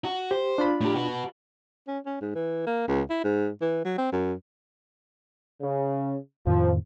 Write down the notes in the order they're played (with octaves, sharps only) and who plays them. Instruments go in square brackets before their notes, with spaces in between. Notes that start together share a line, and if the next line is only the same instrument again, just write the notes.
[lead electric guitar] F#4
[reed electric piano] G4 [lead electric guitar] C5
[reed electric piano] D4 F4 B5
[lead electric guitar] A2 G4
F#4 B4
[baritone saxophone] C#4
C#4
G#2
E3
A#3
C#2
E4
G#2
E3
F#3
C4
F#2
[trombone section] C#3
[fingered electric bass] F2 A2 D#3 [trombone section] F3